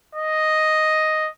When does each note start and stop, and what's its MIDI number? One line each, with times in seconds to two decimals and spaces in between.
0.15 1.30 75